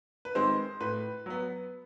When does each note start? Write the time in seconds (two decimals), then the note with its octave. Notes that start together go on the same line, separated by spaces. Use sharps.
0.25 B4
0.35 D#3 G#3 C4 C5
0.80 A2 B4
1.26 F#3 B3